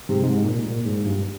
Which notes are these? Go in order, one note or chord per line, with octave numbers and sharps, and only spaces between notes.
G#2 C3
G#2
A#2
A#2
G#2
G2